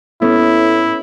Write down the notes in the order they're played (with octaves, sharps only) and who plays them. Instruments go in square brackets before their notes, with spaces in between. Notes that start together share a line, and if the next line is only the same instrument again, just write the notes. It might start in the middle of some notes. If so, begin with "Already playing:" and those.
[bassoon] A2 [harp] B3 C#4 [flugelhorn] E4